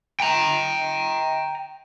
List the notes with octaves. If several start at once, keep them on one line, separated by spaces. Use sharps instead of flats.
G5 A#5